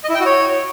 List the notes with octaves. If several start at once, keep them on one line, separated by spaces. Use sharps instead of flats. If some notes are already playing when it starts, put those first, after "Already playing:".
D#5
E4
G5
F#4
C#5